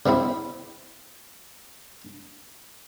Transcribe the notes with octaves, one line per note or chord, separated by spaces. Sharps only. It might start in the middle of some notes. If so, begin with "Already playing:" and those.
C#3 B3 C4 E4